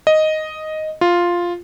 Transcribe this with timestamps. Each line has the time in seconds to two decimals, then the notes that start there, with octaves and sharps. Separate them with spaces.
0.07 D#5
1.01 F4